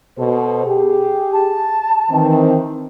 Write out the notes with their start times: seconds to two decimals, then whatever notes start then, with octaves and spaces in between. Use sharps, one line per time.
0.17 B2 A4 C5
0.66 G4 G#4
1.33 A5
2.10 D#3 E3 C4